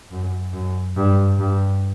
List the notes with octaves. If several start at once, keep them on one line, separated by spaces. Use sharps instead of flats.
F#2
F#2
G2
G2